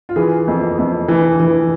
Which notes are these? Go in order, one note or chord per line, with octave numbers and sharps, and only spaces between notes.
F4
E3 G#4
F2
F2
E3
E3